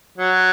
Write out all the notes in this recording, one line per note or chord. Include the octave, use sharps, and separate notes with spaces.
F#3